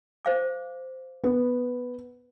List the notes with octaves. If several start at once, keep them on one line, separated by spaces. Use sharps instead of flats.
C5 F5 D6
B3